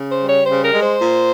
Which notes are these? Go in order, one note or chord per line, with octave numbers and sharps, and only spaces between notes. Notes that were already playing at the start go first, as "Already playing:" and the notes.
Already playing: C#3
C5
G3
C#5
C#3 C5
A#4
G#3
C5
A#2